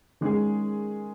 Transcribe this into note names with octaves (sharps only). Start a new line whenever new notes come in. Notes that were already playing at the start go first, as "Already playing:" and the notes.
D#3 G#3 C#4 G#4